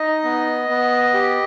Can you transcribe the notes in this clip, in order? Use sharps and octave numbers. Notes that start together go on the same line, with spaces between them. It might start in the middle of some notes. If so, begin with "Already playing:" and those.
Already playing: D#4 D#5
B3
B3
G4